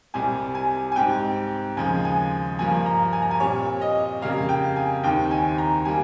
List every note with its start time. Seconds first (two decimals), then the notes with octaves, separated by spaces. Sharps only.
0.14 C2 C3 G3 C4 G#5
0.55 G#5
0.92 G#5
0.96 G#2 G3 C4 G5
1.77 D#2 C#3 F3 G#3 G#5
2.05 G#5
2.59 G2 F3 A#3 G#5
2.86 A#5
3.13 G#5
3.22 A#5
3.31 G#5
3.40 A#2 G3 C4 C#5
3.81 D#5
4.22 F2 C#3 G3 A#3 F5
4.49 G5
4.76 G#5
5.03 D#2 D#3 G3 C4 G5
5.31 G#5
5.58 A#5
5.85 G3 A#3 G#5